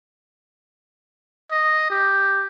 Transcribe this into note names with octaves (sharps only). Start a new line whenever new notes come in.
D#5
G4